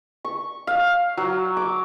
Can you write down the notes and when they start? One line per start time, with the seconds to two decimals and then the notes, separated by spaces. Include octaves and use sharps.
0.25 C#6
0.67 F5
1.17 F#3
1.57 D6